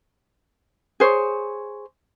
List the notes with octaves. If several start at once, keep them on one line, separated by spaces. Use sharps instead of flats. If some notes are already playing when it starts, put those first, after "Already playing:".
G#4 C5 C#5